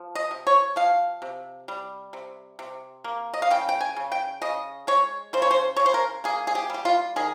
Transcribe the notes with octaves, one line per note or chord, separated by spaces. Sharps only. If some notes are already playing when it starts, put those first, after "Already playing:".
Already playing: F3
D#5
C3
C#5
F3 F5
C3
G3
C3
C3
A#3
D#5
F5
C#3 G5
G5
G#5
C#3
G5
C#3 D#5
G#3 C#5
C#3 C5
C#5
C5
C#3 C#5
C5
A#4
A#3 G#4
G#4
G4
G3 G4
F4
D#3 G#4